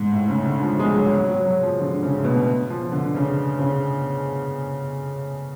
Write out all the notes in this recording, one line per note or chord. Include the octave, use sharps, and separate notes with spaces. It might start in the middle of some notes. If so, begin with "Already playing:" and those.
Already playing: G#2
A2
C#3
D3
F3
G#3
F#3
F#3
F#3
F#3
F3
D3
C#3
A2
B2
F3
D3
C#3
C#3